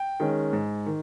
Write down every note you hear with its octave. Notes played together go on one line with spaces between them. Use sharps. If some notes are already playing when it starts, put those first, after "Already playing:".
Already playing: G5
D#3 G#3 C#4
G#2
D#3